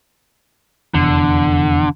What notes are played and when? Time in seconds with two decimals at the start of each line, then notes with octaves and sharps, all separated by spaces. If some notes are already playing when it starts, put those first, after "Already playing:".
0.94 F1 E2 D3